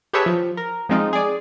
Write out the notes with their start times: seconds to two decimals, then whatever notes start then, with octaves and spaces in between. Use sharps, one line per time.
0.13 G4 G#4 B4 C#5 E5 A5
0.26 F3
0.57 A#4
0.89 F3 G#3 C4 D#4 F4
1.13 G#4 D5